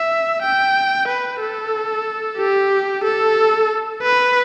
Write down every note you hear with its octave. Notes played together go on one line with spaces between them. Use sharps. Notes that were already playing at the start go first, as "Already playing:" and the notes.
Already playing: E5
G5
B4
A4
G4
A4
B4